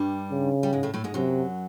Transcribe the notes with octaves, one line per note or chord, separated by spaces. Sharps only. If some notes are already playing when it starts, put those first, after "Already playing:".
Already playing: G2 G3
C#3
G3
G#2 G#3
A2 A3
A2 A3
G#2 G#3
F#2 C3 F#3